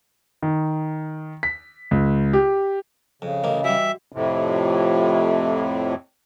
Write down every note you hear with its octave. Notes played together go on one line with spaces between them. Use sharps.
D#3
B6
C#2
G4
F2 C#3
A1 D2 A#3 D#5
E3 G3 F#4 E5
F2 A2 C3